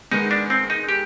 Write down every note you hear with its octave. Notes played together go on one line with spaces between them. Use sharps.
D#3 G#3 B3 D#4
D4
C4
D#4
G4